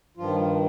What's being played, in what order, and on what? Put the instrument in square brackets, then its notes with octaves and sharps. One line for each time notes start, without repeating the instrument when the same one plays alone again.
[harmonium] G2 D#3 F3 F4